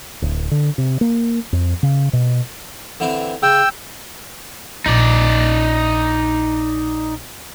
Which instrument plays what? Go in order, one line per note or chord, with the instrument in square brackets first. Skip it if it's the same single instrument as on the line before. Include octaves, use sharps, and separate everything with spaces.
[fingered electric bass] D1
D3
C3
A#3
F2
C#3
B2
[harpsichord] D3 E3 C4
[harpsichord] C#3 [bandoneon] G5 E6
[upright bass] A#1 [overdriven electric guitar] D#4 D5